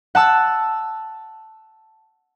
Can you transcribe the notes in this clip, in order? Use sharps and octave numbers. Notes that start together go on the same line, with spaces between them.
F#5 A5 E6